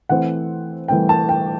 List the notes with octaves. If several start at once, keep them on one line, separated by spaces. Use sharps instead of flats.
E3 A3 C4 F#5
E3 A3 C4 G5
A5
G5